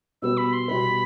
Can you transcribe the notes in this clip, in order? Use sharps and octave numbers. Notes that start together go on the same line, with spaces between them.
B2 G3 B3 F#4 B4 E6
B5
C6
B2 G3 B3 F#4 B4 B5